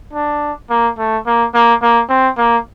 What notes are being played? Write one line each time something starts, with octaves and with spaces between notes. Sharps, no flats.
D4
A#3
A3
A#3
A#3
A#3
C4
A#3